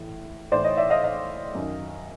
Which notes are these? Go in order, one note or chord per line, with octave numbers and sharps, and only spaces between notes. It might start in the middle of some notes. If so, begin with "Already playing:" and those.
Already playing: A2 E3
A2 E3 C5 D5
C#5 D#5
D5 E5
D#5 F5
D#5 F5
F#2 D#3